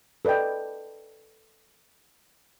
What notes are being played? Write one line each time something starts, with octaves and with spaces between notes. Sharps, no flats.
A4 B4 D5 D#5 G5